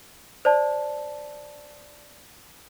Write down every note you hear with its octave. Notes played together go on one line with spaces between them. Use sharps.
C5 D5 A5